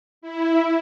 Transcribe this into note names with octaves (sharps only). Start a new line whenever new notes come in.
E4